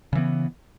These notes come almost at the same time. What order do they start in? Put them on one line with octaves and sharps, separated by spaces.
C#3 E3 B3